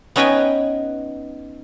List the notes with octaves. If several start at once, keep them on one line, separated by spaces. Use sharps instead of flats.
B3 C#4 D#4 B4 G5 G#5